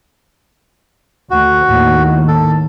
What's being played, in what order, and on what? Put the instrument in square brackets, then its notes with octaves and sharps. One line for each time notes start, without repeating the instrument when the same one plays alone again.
[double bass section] D2 [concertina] F#4
[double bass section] D#2 A2 D#3
[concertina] A4